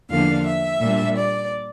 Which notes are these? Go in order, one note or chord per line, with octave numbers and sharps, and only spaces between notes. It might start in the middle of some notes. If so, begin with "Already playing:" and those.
E2 D3 F3 A#3 D4 F5
E5
A#2 G3 A#3 D4
D5